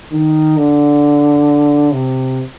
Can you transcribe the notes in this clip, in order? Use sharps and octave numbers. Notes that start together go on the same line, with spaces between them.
D#3
D3
C3